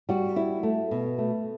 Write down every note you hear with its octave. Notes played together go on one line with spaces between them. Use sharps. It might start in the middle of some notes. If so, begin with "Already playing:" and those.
G3 F#4
E4
A3
B2
A3